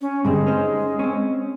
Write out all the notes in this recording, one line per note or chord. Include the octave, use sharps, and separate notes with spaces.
C#4
G2 D3 G#3 C4
C#4 D#4 C5
C4 C#4